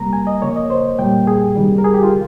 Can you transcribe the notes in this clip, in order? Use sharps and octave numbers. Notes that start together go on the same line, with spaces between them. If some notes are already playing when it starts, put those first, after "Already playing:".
Already playing: C3 G3 A#3 A#5
G#5
D#5
C#3 F3 A#3 C#5
D#5
C5
A#2 G3 A#3 G5
G#4
C3 D#3 G3
A#4
G#4
G4
F4